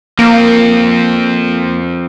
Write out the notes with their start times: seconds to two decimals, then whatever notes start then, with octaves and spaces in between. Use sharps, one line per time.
0.19 F3 A#3 C4